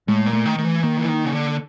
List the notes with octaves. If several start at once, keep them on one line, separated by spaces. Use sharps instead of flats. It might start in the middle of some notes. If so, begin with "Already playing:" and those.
A2 G#3
A#2
A3
D#3
D#3 A3
E3
D#3 A#3
E3
D#3
C#3
D3